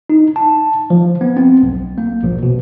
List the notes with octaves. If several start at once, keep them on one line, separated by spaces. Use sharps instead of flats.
D#4
A5
F3
B3
C4
B1
A#3
A#1
B2